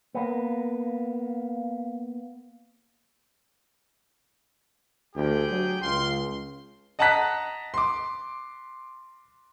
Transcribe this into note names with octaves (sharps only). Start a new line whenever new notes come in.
A#3 B3
D2 G4 G#4 G5
F#3
C#2 F5 C6
D#5 F#5 A5 A#5 F#6 B6
C6 D6